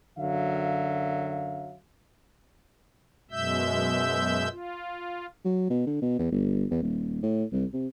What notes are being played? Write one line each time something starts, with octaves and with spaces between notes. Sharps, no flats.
F#2 D3 F#3 E5 F5
F#2 B2 G#3 E5 E6 G6
F4
F#3
B2
D3
B2
E2
G1
E2
D#1
A2
C2
C3